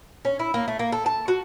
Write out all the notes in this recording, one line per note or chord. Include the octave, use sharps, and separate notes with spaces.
C#4
E4
A#3
A3
A#3
A4
A5
F#4